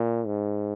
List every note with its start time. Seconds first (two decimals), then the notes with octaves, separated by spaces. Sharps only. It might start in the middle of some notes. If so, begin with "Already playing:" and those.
Already playing: A#2
0.26 G#2